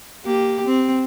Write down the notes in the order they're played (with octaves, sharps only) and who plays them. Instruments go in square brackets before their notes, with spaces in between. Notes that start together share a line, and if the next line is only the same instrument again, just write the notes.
[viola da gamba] A#3 G4
C4